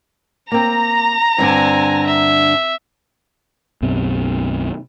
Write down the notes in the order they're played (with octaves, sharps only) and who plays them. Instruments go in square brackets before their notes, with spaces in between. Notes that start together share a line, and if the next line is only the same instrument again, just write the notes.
[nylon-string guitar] A#3 C4 [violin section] A#5
[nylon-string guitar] G2 D3 D4 [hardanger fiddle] C4 G#5
[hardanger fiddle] E5
[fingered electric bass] B1 F#2 B2 C4